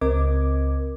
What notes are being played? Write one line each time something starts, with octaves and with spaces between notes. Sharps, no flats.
C#2 C4 A#4 D#5 D6 G#6